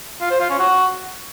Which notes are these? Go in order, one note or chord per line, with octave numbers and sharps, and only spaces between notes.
F4
C5
F4
C#4
F#4